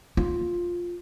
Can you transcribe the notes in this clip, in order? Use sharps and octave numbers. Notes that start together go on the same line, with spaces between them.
F4